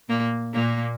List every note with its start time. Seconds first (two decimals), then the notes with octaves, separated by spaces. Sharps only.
0.09 A#2 A#3
0.54 A#2 A#3